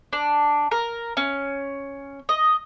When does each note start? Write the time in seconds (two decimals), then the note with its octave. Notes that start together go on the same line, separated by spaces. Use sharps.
0.13 D4
0.71 A#4
1.17 C#4
2.29 D#5